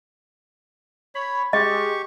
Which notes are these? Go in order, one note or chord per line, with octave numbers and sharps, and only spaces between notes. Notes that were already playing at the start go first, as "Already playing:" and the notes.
C#5 B5
G#3 G4 D#5 C#6